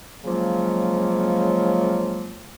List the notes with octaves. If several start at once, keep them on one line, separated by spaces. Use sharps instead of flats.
C#3 F3 F#3 G#3 A#3